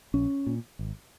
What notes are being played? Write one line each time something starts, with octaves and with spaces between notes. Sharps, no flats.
A#1 C#4
A#2
G#1